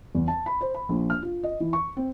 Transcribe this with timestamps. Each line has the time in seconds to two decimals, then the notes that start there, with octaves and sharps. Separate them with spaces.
0.15 E2
0.28 A5
0.46 B5
0.61 C5
0.75 B5
0.89 A#1
1.10 F6
1.22 F4
1.43 D#5
1.60 E3
1.73 C#6
1.97 C4